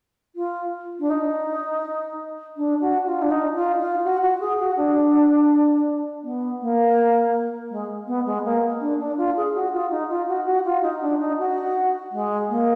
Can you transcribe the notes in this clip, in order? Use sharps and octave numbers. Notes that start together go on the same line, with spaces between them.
F4
D4
D#4
D4
F#4
F4
D4
D#4
F4
F4
F#4
F#4
G#4
F#4
D4
B3
A#3
G#3
B3
G#3
A#3
D4
D4
F4
G#4
F#4
F4
D#4
F4
F#4
F#4
F4
D#4
D4
D#4
F#4
G#3
A#3